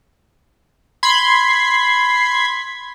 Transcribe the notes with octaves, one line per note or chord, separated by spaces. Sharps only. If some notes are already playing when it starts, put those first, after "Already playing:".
B5 C6 G#6